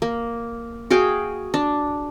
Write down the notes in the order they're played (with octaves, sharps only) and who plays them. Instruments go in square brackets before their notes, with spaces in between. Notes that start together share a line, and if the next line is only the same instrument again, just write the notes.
[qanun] A#3
F#4 G#4 F5 G5
D4